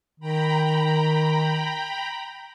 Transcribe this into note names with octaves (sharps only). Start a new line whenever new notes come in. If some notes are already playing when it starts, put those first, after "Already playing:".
D#3 G5 A#5 B5